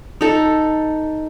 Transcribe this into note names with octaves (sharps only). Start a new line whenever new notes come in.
D#4 A4